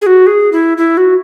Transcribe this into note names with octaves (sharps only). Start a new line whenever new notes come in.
G#4
F#4
G#4
E4
E4
F#4